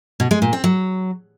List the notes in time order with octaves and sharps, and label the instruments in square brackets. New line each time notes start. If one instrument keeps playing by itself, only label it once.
[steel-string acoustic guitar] B2
G#3
A#2
C4
F#3